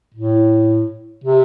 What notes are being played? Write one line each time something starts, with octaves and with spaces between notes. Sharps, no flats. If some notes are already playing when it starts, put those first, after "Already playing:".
A2
C3